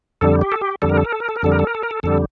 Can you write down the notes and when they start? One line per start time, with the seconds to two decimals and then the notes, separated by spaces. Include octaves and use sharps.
0.21 F2 D3 G3 A4
0.41 G4
0.52 A4
0.61 G4
0.82 F2 D3 G3 A4
0.89 A#4
0.98 A4
1.05 A#4
1.12 A4
1.20 A#4
1.29 A4
1.36 A#4
1.42 F2 D3 G3 A4
1.52 A#4
1.59 A4
1.67 A#4
1.75 A4
1.83 A#4
1.91 A4
2.03 F2 D3 G3 A4